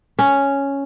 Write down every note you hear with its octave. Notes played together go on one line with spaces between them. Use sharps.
C#4